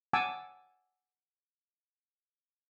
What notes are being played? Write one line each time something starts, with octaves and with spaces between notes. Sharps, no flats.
F#5 G#5 A5 D6 E6